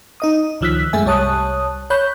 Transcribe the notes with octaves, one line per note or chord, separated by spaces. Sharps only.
D#4 D#5 D#6
C#2 D#3 F3 E6 F#6 B6
F#2 G#3 A3 E5 G#5
C2 G3 C#5 A5 D#6 F#6
C#5 B5 F#6 G6